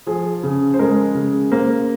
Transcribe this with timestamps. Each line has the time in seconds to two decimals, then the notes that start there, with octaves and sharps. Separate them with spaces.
0.07 F3 G#4
0.43 C#3
0.74 C5
0.79 G#3 A#4
1.15 C#3
1.52 A#3 C5